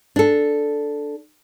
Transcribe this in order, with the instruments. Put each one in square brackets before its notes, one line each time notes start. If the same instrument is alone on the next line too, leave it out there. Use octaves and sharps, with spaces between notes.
[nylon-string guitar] D4 A4